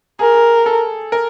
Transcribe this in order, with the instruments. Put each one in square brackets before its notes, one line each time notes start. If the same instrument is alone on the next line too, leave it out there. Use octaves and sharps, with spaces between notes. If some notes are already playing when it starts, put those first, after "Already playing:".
[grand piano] G#4 [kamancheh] A#4
[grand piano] A4
A#4